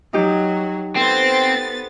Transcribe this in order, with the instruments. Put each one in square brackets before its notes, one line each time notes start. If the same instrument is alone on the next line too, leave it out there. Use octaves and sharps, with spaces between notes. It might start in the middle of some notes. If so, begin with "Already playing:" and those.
[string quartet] F#3 [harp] D#4 G4
[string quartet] B3 A6 [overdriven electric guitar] C4 [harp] A4 C5